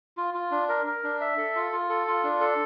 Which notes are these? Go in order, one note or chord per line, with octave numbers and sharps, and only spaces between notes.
F4
F4
D4
A#4
A#4
D4
E5
A4
F4
F4
A4
F4
D4
A4